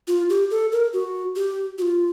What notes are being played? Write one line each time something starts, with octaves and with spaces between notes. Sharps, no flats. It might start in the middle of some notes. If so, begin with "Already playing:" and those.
F4
G4
A4
A#4
F#4
G4
F#4
F4